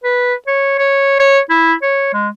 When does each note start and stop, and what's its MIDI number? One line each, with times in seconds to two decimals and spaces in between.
0.04 0.34 71
0.47 0.78 73
0.79 1.18 73
1.20 1.39 73
1.50 1.74 64
1.82 2.10 73
2.14 2.28 56